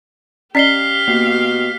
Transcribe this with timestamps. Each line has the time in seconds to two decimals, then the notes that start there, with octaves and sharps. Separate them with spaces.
0.55 C#4 G4 D5 D#5 F5 B6 C7 G7
1.08 B2 A#3